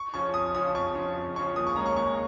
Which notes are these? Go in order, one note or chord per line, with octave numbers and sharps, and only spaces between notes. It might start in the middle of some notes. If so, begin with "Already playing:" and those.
Already playing: C#6
C#3 F3 C#4 C#6
F2 D#6
C#3 F3 C#4 D#6
F2 C#6
C#3 F3 C#4
F2
C#3 F3 C#4 C#6
D#2 D#6
C#6
C#3 G#3 C#4 A#5
C#6
D#2 C#6